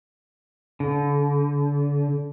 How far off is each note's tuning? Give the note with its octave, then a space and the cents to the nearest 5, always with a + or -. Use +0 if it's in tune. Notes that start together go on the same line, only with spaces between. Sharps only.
D3 -35